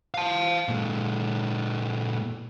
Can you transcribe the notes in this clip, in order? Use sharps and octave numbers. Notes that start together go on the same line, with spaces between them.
F5 A5
A#2 G#3